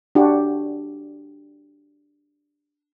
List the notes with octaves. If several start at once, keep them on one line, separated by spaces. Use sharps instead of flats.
D4 F#4 G4